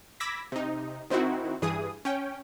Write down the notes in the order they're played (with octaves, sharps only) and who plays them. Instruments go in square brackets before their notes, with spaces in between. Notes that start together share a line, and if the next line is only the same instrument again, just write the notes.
[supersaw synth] B5 D6 E6 G#6 A#6 B6
C3 D#4
D#3 C4 D#4 E4 F#4
G2 E3 G#4 D#6
C#4 G5